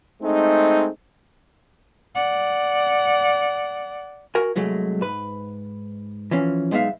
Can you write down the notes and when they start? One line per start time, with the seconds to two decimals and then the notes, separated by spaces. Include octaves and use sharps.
0.22 G#3 A3 C4 D#4
2.15 D5 F#5
4.35 F#4 A#4 G#5
4.56 C2 F#3 G#3 A3
5.01 G#2 B4
6.31 E3 F3 C#4
6.71 B1 G#3 B3 D#4 E5 F5